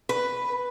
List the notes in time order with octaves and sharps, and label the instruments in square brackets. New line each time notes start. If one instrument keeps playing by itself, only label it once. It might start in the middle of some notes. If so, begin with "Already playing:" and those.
[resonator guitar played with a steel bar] B4